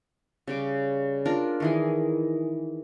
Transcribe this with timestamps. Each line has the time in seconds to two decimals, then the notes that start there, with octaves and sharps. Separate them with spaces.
0.47 C#3 G3 D6
1.25 D4 F4 A#4
1.60 D#3 E3 G#4